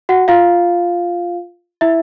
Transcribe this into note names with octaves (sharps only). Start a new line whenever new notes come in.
F#4 F#5
F4 F5
E4 E5